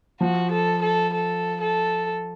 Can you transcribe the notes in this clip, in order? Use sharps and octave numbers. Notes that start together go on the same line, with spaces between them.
F3 F#4
A4
A4
A4
A4